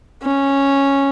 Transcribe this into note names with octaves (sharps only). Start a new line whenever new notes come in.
C#4